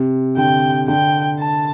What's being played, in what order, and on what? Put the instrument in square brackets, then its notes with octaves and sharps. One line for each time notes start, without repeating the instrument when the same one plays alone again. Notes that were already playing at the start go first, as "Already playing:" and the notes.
Already playing: [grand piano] C3
[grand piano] D3 [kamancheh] G5
[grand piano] D3 [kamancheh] G5
[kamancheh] A5